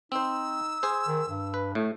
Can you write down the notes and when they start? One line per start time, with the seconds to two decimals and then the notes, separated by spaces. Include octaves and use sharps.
0.12 C4 D#4 C5 E6
0.83 G#4 C5
1.07 D#3
1.29 G2
1.54 B4
1.75 A2 A3